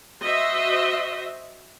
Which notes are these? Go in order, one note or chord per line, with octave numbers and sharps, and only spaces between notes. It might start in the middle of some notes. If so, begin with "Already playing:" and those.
F#4 C5 D#5 E5